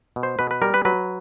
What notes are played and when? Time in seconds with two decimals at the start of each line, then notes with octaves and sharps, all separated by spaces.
0.16 B2
0.23 C5
0.39 B2 B4
0.51 B4
0.62 G3 A#4
0.74 B4
0.85 F#3 B4